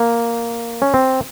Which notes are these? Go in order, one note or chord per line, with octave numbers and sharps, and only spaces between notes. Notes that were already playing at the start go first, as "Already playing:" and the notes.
Already playing: A#3
C#4
C4